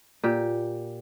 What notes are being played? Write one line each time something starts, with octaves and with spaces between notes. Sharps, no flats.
A#2 G4